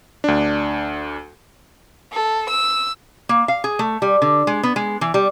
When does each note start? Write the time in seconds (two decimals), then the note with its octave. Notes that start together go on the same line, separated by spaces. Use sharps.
0.24 D2 D4
2.13 A4
2.50 E6
3.29 A#3
3.48 F5
3.64 G#4
3.79 A3
4.02 G3
4.22 D3
4.47 G#3
4.63 B3
4.76 G#3
5.01 E3
5.14 G3